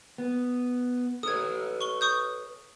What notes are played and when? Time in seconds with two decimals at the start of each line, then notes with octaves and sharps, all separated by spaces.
0.18 B3
1.23 A4 B4 C#5 D#6 G#6
1.81 C#6 G7
2.01 C#6 D#6 G6